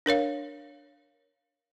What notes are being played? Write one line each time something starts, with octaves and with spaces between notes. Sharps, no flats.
D4 A#4 C#5 F5